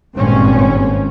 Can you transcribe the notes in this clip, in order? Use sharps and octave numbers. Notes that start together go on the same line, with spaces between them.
G#1 G2 A#2 C4 C#4